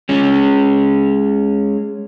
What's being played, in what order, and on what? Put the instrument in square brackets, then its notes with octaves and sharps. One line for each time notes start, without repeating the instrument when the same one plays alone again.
[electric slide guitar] G#3 C#4